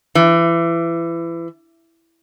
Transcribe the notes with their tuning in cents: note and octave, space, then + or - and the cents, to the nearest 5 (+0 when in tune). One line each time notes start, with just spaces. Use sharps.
E3 +25